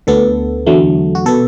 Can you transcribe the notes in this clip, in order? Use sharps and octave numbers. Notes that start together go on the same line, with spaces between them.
D2 D3 B3 A4
E2 D3 F#3 A3
F#4
B2 B3 A4